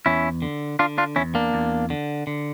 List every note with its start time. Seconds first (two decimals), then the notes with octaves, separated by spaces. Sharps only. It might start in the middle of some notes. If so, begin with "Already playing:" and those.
0.06 E2 C#4 E4
0.42 D3
0.79 D3 D4 F4
0.98 D4 F4
1.16 E2 C#4 E4
1.35 A#3 D4
1.54 E2
1.90 D3
2.27 D3